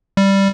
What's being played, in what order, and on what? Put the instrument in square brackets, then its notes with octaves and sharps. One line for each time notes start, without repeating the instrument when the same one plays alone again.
[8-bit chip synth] G3